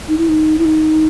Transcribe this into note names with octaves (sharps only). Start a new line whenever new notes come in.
D#4
E4
D#4
E4
D#4